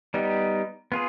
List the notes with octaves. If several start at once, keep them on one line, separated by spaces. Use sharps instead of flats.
G3 B3 D#4 G4
B3 F4 G#4